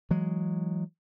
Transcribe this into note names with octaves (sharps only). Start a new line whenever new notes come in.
E3 F#3 G#3